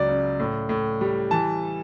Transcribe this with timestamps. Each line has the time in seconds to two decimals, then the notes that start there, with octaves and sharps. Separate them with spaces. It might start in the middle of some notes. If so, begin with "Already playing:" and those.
Already playing: C#2 F#3 D5
0.09 C#3
0.40 A2
0.69 A2
1.01 G3
1.31 E3 A5